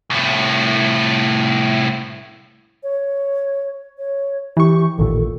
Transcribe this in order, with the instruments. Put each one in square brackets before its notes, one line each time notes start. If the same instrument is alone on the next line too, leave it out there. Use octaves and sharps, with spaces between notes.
[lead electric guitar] C2 A2
[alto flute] C#5
C#5
[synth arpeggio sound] E3 C#6 [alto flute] G4
[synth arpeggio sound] A1 D#2 A#2 [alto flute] A4